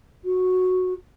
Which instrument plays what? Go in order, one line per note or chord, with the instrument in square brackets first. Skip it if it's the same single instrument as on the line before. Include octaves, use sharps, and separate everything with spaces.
[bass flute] F#4